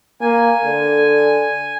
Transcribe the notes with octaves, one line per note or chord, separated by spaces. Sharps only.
A#3 G#5
D3